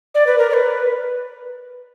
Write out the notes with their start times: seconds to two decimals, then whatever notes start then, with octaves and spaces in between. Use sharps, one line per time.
0.15 D5
0.27 B4
0.38 A#4
0.50 D5
0.54 B4